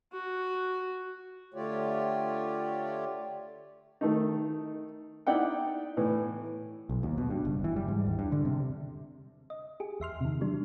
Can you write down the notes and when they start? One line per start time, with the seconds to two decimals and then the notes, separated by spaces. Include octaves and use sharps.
0.13 F#4
1.54 D3 A3 F4 G4 C#5 D5
4.01 D#3 A3 D#4
5.27 D#4 E4 D5 F#5 G5
5.97 A2 E3 B3
6.89 B1
7.03 D#2
7.18 B2
7.30 G2
7.45 F#1
7.64 E3
7.76 G3
7.88 G#2
8.07 D#2
8.19 G2
8.32 D3
8.45 C3
9.50 D#5
9.80 G4 G#4
10.00 E2 E5 C6 F6
10.21 C3 D#3
10.41 E3 F#3 G3 D4